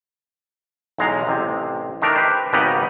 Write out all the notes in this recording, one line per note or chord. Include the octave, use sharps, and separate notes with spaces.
B1 E2 G#3 A#5
A1 C3
D#3 A3 D4 A#4
G4 B4 C5
G#1 C#3 B3 D#4 G4 B4